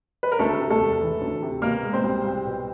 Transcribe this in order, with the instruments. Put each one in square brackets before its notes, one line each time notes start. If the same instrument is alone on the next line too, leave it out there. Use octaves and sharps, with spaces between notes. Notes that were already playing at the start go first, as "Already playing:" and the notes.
[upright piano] B4
A#4
D2 A3 A4
C3
A3 A4
E1
E3
D2
C3
B2 A#3 A#4
G#3
C4 C5
C2
C2
B2